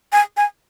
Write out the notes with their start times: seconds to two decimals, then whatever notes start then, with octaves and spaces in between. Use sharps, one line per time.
0.12 G#5
0.37 G#5